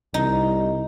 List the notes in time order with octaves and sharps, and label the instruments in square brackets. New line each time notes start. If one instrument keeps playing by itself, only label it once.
[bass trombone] C2 [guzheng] D#4